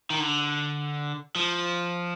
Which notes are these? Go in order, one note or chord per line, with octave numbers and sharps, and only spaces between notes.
D#3
D3
F3